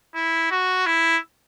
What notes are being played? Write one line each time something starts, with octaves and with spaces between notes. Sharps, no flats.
E4
F#4
E4